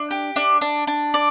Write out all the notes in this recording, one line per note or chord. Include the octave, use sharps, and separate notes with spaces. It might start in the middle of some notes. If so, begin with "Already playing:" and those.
Already playing: D4
G4
D4
D4
D4
D5